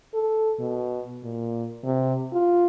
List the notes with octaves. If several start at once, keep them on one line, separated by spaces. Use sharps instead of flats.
A4
B2
A#2
C3
F4